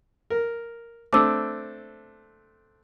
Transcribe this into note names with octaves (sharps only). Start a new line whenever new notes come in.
A#4
A3 C4 D4 D6 E6